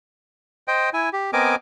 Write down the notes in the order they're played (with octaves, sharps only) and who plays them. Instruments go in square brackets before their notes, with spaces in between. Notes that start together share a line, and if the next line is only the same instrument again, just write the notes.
[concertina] C5 D#5 G5
E4 G#5
G4
B3 C4 A#4 D#5 G#5 D6